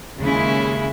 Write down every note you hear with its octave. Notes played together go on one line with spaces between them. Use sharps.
D#2 C#3 G#3 C#4 E4